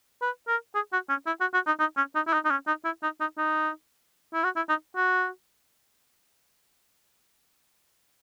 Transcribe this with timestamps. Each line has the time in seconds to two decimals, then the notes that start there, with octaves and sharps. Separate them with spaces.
0.22 B4
0.48 A#4
0.75 G#4
0.93 F#4
1.09 C#4
1.26 E4
1.41 F#4
1.54 F#4
1.67 D#4
1.79 D#4
1.97 C#4
2.15 D#4
2.27 E4
2.33 D#4
2.45 D#4
2.51 C#4
2.67 D#4
2.85 E4
3.03 D#4
3.20 D#4
3.38 D#4
4.34 E4
4.44 F#4
4.56 E4
4.69 D#4
4.96 F#4